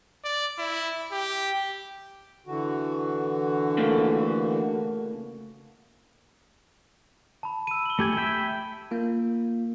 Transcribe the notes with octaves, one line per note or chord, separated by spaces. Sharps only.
D5
E4
G4
D3 E3 F#4
C#3 A3 A#3
A5 B5
E6 D#7
F#7 G7
A3 G4 G#5
E5 G5 B5
A#3 F4